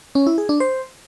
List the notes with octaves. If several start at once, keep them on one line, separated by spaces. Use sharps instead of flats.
C#4
E4
G#4
D4
C5